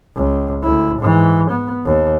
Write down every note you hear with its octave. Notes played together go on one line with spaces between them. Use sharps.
C#2
D2 E4
G#2 E3
B3
D#2